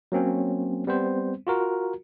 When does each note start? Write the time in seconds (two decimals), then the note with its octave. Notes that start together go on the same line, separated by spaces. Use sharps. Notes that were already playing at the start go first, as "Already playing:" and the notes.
0.12 F#3 A#3 C4 C#4
0.87 G3 B3 C4 C5
1.47 F4 F#4 A#4